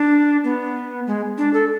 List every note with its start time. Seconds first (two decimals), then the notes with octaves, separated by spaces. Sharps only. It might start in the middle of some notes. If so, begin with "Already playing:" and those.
Already playing: D4
0.44 B3
1.07 G#3
1.38 D4
1.54 A4